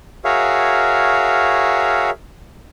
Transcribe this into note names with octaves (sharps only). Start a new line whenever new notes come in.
F#4 G#4 A#4 C#5 E5 F5